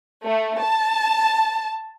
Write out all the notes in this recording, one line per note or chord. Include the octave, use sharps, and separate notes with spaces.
A3
A5